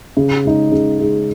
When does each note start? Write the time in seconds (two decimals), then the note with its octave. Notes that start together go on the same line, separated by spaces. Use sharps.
0.17 C#3
0.45 G#3 D#4
0.72 C#3
0.99 G#3 D#4